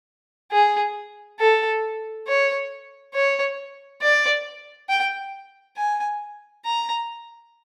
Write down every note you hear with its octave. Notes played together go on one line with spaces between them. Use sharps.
G#4
A4
C#5
C#5
D5
G5
G#5
A#5